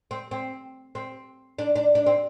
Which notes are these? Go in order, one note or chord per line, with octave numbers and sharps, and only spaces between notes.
C4
C4
C4
D4
D4
D4
C4